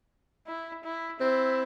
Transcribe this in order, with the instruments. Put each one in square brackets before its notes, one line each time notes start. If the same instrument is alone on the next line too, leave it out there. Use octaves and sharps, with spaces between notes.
[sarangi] E4
E4
[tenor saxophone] C4 [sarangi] E4